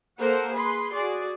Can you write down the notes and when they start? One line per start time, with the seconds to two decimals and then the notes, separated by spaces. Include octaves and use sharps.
0.19 A#3 A4 A#4 C5 F#5
0.53 G#4 B4 B5 C6
0.93 F#4 G#4 D5